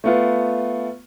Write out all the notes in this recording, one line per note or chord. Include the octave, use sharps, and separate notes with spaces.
A3 B3 F4